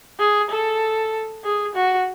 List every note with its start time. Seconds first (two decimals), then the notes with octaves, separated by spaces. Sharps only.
0.19 G#4
0.50 A4
1.44 G#4
1.75 F#4